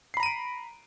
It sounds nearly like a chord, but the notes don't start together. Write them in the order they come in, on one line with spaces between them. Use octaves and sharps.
C7 B5 A#5 D#7 D7